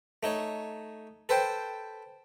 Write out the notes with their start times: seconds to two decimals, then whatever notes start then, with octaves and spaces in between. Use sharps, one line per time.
0.23 A3 D#4 C#5
1.29 A4 B4 C5 G5